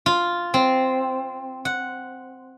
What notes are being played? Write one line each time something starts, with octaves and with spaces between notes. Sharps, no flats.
F4
C4
F#5